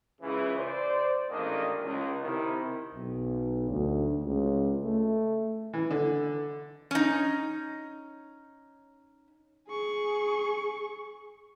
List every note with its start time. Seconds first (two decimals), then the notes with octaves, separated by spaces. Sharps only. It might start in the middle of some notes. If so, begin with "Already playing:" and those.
0.22 C#2 C#3 E3
0.58 C5 D5
1.29 A1 G#2 D#3 A#3 D4 D#5
1.82 C#2
2.22 C3 D#3 E4
2.95 B1
3.70 D2
4.24 C#2
4.84 A3
5.73 E3
5.91 D3
6.91 C#4 D#4
9.68 G#4 C#6